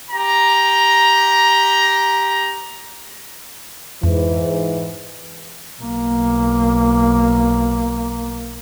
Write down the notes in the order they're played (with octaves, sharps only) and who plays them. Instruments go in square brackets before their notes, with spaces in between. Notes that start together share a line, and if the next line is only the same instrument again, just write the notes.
[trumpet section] G4 A#5
[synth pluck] F2 [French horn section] G#2 E3
[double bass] B1 A#3